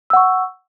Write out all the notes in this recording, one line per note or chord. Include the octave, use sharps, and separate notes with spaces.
F#5 C#6 E6